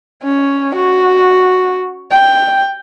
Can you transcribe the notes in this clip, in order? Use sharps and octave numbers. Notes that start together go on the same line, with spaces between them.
C#4
F#4
G5